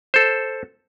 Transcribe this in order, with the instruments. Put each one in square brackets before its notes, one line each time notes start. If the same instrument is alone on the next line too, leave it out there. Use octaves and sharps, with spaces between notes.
[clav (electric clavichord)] A4 C5